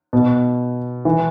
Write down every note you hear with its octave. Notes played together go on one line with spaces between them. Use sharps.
B2
E3